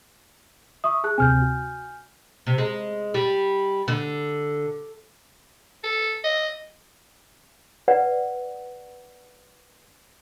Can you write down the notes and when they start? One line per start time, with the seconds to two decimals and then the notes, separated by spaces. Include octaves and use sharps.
0.84 E5 C#6 D#6
1.04 G#4 A5 F#6
1.18 D2 C3 C4 G#5 F6 G6
1.42 F#4
2.46 C3
2.58 G#3
3.14 G3
3.88 D3
5.83 A4
6.24 D#5
7.88 B4 D5 F#5